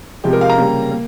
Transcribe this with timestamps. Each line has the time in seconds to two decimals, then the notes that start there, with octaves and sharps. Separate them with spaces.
0.24 C3 F3 G#3 G4
0.33 A#4
0.41 F5
0.50 A#5
0.58 C#3 G3 A#3
0.92 A#3